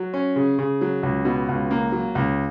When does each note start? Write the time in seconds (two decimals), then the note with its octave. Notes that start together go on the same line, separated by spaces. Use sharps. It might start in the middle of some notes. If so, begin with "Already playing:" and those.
Already playing: F#3
0.13 C#4
0.36 C#3
0.59 C#3
0.81 F#3
1.03 C#2
1.25 B2
1.48 C#2
1.71 A#3
1.92 F#3
2.15 C#2